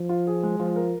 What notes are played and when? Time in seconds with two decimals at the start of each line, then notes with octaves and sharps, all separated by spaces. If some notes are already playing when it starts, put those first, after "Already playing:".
Already playing: F3
0.09 F4
0.27 G#4
0.43 G#3
0.59 F3 F4
0.76 A#4